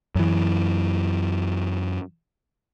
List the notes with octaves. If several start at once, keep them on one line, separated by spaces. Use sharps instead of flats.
F#2 E3